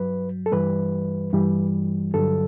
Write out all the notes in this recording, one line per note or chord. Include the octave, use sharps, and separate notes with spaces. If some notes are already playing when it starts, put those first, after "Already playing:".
Already playing: G2 F#3 B4
A4
G2 E3 G3 B4
G2 E3 G3
G2 D3 F#3 A4